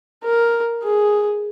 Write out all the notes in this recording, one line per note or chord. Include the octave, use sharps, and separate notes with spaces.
A#4
G#4